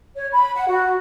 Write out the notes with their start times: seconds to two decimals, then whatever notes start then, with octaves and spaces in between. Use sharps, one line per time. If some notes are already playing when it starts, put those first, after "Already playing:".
0.16 C#5
0.32 B5
0.55 F#5
0.68 F#4